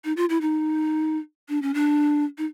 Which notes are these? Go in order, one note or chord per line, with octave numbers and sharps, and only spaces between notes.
D#4
F4
E4
D#4
D4
C#4
D4
D#4